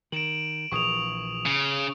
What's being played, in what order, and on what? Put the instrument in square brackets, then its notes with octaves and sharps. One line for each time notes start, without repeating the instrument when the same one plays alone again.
[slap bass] D#3 [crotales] D7 E7 F#7
[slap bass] A#1 E3 [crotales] C#6 D#6 F7
[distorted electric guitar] C#3